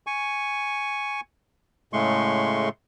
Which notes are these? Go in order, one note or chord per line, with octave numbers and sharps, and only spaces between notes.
G#5 C#6
A2 C#3 G#3 A3 C6 C#6